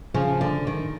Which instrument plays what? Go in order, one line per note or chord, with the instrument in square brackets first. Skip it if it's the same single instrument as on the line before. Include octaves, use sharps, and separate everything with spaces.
[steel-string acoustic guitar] C#3 [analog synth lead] F3
[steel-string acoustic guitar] D3
D#3